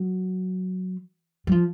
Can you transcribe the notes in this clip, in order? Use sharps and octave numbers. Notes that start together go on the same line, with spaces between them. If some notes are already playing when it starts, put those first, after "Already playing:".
Already playing: F#3
F#3
F3